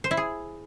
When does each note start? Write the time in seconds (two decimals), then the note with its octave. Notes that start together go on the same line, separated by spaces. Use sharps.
0.04 C5
0.11 E4
0.17 G#4